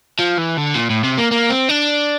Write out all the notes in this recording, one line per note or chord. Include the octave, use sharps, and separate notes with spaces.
F3
E3
D3
A#2
A2
C3
A#3
A#3
C4
D4